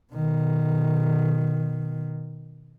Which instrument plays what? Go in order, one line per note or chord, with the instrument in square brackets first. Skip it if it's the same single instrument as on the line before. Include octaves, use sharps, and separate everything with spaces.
[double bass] B2 D#3